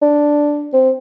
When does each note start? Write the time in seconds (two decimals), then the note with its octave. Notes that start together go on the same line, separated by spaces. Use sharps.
0.02 D4
0.73 C4